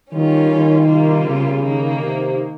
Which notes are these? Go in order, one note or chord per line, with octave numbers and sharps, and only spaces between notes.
D#3 G3 C#4 F4
D#3
C3 G3 A#3 F4
C#3
D#3 A#3 D#4
C3